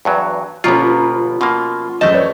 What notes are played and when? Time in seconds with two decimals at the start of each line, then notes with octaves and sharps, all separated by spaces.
0.05 E2 G2 F#3
0.64 G1 B2 F3 A#3 C#4 F4 A#5 B5
1.41 B2 A#3 F4
2.01 A#1 F#2 A3 C5 D#5 A5
2.13 B4 C#5 D5